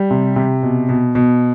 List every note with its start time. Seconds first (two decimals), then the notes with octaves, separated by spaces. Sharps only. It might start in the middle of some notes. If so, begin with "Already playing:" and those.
Already playing: G3
0.11 C3
0.36 C3
0.63 B2
0.89 B2
1.15 B2